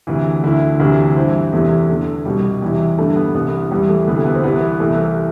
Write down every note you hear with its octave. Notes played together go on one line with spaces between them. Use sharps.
D2 C3 E3
D2 D3 E4
D2 C3 E3
G2 E3 C4
E2 C3 E3 A3
E2 D3 A3
C2 B2 G3
E2 C3 E3
G2 D3 A3
B3
C2 C3 E3 B3
E2 C3 E3 G3
A3
D2 C3 E3 B3
A3
B3
C4
C2 C3 E3 B3
C2 C3 E3 A3